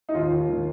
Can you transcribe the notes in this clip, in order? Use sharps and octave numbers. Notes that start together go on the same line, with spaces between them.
D#4
D#2 F4
D#2
D#3